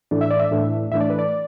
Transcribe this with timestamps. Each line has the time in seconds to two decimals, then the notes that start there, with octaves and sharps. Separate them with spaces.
0.11 A2 E3 A3 D4
0.21 E5
0.31 D5
0.40 E5
0.51 A2 E3 A3 D4
0.92 A2 E3 A3 D4 E5
1.01 D5
1.10 B4
1.19 D5